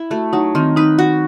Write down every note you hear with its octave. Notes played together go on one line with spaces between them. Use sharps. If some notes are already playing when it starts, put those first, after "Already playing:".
Already playing: E4
A3 F#4
F#3 D#4
D#3 C4
D#4 B4
F#4